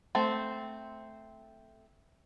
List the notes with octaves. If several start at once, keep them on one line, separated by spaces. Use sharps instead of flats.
A3 C4 C5